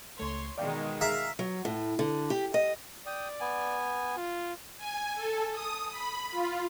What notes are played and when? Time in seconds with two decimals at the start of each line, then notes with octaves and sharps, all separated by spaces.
0.20 C#2 A3 C#5 C6
0.58 B2 D#3 G#3 D5 F5 G5
1.01 G#4 E5 F5 A#5
1.39 F#3
1.65 A2
1.99 D3
2.30 G4
2.54 D#5
3.06 D5 G5 D#6
3.40 B3 G#5
4.17 F4
4.77 G#5
5.15 A4
5.52 D#6
5.90 B5
6.31 F4